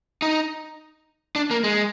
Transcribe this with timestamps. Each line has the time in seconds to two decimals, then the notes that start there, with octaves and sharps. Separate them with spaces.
0.22 D#4
1.36 D4
1.51 A#3
1.64 G#3